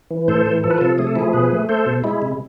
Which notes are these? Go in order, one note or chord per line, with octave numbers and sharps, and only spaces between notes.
E3
A2 A4 C5
E3
F3 A4
B4
C3 F4 A4
A3 G#4
A4
F3 E4 G#4
B2 G#4 B4
A3
A3 A4 C5
B2
G#3 E4
C3